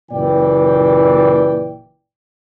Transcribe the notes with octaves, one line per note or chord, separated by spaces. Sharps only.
F#1 A#2 E3 D5 G5